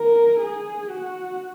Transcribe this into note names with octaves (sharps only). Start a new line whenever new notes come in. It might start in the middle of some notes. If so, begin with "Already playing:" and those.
Already playing: A#4
G#4
F#4